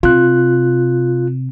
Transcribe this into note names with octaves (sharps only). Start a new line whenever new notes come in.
C3 F4 F#6